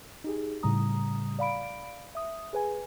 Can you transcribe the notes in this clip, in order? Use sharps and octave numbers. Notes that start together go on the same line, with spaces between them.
D#4 G4 G#4
A2 C#3 G3 A#5 D#6
D5 F5 B5 D7
E5 D#6
G#4 B4 G#5